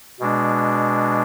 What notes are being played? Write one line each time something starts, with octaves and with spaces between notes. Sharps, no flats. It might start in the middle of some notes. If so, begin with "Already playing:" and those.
B2 G#3 D4